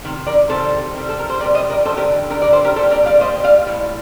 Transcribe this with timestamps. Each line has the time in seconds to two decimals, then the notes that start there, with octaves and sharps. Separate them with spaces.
0.05 C3 D#3
0.27 A#4 D5
0.49 C3 D#3 G3 A4 C5
0.94 C3 G3
1.09 A4
1.19 A#4
1.30 C5
1.40 C3 A#4 D5
1.43 G3
1.55 C5 D#5
1.70 A#4 D5
1.85 G3 A4 C5
1.89 D3
1.97 G4 A#4
2.30 D3 G3 G4 A#4
2.42 A#4 D5
2.53 A4 C5
2.64 G4 A#4
2.76 A#2 G3 A4 C5
2.91 A#4 D5
3.06 D5 F5
3.21 A#2 G3 C5 D#5
3.44 D5 F5
3.66 A2 G3